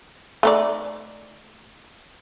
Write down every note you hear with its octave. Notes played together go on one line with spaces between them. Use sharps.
A3 D#4 D5